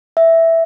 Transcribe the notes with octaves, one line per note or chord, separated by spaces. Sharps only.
E5